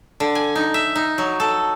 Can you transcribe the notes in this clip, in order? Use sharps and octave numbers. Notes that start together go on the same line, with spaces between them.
D3
G#5
D#4
E5
D#4
F#3
A4